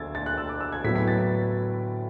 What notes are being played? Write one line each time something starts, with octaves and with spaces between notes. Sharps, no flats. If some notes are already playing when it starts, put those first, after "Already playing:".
Already playing: D2 F#3 E6 G#6 A6
A6
F#6
E6
D6
E6
G#6
A2 F#3 B3 B6
B6
A6